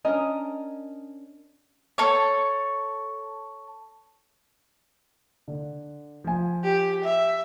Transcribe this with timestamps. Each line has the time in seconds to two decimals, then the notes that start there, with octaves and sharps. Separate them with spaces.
0.05 C#4 D4 A#4 D#5
1.98 A4 C#5
5.48 D3
6.24 F3 G#5
6.64 G4
7.04 E5